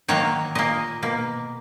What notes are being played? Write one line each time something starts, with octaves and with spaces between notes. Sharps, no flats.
D#3 F#3 A#3 C#5
A#2 A#3 D#5
B2 A#3